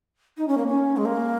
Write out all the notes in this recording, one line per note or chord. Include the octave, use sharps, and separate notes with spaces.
D#4
C#4
A#3
C#4
G#3
A#3